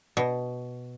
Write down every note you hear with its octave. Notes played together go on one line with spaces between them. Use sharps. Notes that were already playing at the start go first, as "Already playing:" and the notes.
B2